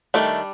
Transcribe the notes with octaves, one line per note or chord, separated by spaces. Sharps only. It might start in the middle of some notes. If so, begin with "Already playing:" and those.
D#3 G3 A3 D4 A4